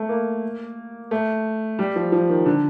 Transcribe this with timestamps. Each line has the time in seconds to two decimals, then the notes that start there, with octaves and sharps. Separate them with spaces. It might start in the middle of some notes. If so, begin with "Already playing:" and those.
Already playing: A3
0.09 A#3
1.11 A3
1.79 G3
1.96 F3
2.12 F3
2.29 D#3
2.46 D3